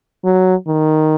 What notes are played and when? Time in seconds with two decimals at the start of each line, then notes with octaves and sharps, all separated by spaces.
0.24 F#3
0.67 D#3